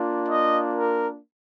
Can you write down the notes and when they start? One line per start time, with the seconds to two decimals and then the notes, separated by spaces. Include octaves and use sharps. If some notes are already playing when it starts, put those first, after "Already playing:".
Already playing: A#3 D4 F4
0.29 D#5
0.74 A#4